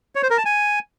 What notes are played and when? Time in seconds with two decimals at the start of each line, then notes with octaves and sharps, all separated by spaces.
0.15 C#5
0.23 C5
0.30 A#4
0.38 A5
0.45 G#5